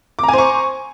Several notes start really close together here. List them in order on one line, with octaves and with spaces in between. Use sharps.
D6 A#5 G#5 C5 C#6